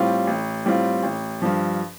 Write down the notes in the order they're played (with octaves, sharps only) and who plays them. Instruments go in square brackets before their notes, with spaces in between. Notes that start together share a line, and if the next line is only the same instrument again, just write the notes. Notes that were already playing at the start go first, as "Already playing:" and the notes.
Already playing: [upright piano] A2 G3 C4 F4
A1
A2 G3 C4 F4
A1
G2 F3